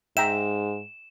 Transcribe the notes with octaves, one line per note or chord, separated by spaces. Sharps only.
G#2 E5 G5 A#5 E7